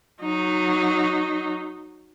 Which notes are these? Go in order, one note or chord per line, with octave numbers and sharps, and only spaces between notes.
F#3 D#4